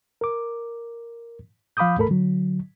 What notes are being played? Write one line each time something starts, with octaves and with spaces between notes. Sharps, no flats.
A#4 D6
F3 F5 B5 D6 D#6 G6
D#2 G#2 A3 A4 A#4 B5
D3 F#3